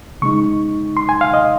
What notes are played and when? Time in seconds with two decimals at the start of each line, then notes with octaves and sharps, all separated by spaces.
0.22 C#3 G#3 D#4 C#6
0.97 C6
1.09 G#5
1.21 F5
1.34 D#5